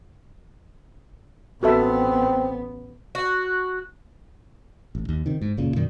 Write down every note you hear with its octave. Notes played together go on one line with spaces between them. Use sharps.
A1 B3 C4 F#4 A4 E5
F#4
A1
D#2
C3 D#3
G#2
F#1 A#2 C#3
F#2 B2 D#3 G3